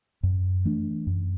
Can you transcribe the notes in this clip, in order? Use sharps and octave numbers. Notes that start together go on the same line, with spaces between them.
F#2
E3 A3 D4
F#2